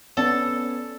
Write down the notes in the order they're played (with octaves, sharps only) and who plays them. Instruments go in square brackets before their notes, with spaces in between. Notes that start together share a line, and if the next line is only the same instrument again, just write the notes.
[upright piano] B3 C#4 D5 [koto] A4